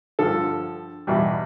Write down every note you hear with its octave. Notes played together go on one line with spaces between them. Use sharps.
G2 D3 F3 A4
E2 B2 G3